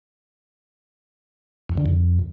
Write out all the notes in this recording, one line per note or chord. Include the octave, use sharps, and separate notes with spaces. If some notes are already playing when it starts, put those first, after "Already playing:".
E2
D3
F2